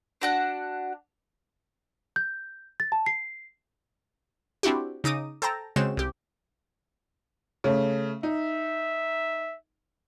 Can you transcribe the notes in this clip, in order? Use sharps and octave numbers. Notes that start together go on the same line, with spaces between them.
D4 F#4 F#5
G6
A6
A5
C7
C4 D4 E4 F#4 G4
C#3 D#4 D6 D#6
A4 C5 G5 A5 A#5
C#3 G#3 C4 F#4 C6 E7
C2 G4
C#3 A3
D#4 E5